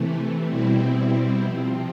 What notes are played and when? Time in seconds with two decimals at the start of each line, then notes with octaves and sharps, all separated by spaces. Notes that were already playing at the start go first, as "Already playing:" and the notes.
Already playing: C3 E3 A3
0.46 B2 G3 C4 E4
1.42 C3 F3 C4